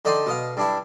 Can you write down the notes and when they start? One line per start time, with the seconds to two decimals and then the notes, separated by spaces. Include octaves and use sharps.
0.05 D3 D#4 D5 G5 C6
0.26 B2 D#5 F5
0.57 G2 D4 E4